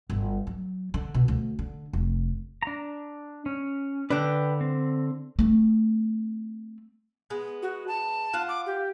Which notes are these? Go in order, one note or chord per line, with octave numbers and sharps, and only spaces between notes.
G1
F#3
D3
B2
D2
D3
F1
D4 A#5
C#4
D3 D4 B4 G5
C4
A3 C4
G#3 B3
F#4
A5
F4 F5 F#5
D6
G4